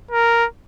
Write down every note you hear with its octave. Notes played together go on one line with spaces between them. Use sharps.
A#4